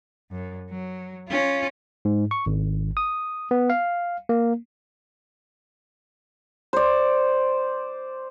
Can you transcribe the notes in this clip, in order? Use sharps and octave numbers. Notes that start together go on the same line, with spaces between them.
F#2
F#3
C#4 F4
G#2
C#6
G#1
D#6
B3
F5
A#3
C5 D5